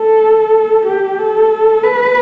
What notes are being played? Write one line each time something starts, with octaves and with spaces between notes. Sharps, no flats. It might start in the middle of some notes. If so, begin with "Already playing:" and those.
Already playing: A4
G4
A4
B4